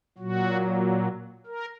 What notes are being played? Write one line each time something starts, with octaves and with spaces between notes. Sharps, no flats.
A#2 F#3 F#4
A#4